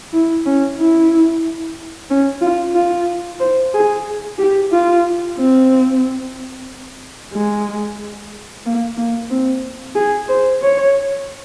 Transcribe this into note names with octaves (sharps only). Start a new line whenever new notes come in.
E4
C#4
E4
C#4
F4
F4
C5
G#4
G4
F4
C4
G#3
A#3
A#3
C4
G#4
C5
C#5